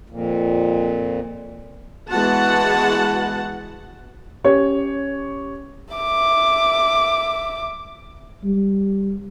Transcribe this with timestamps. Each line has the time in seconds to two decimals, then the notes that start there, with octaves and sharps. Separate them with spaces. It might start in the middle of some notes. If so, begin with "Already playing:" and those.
0.10 F2 A#2
2.10 E3 G#3 B3 F#4 F#5 A5
4.44 C#4 G4 C#5
5.94 E5 D6
8.44 G3